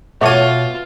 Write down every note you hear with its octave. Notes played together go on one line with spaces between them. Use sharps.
B2 A3 F4 C#5 E5 F#5 D6 D#7